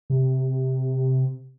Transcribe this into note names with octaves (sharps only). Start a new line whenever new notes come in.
C3